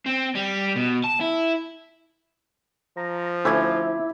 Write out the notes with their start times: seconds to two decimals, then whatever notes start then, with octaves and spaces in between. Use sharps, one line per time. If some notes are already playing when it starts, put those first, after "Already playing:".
0.06 C4
0.35 G3
0.76 B2
1.04 A5
1.21 E4
2.97 F3 A#5
3.45 D2 A3 C#4 E4 E5 B5 D6 G#6